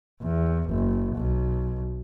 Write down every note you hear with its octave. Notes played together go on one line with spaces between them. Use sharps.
E2
F#1
B1